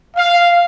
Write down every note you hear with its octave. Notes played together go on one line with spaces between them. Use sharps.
F5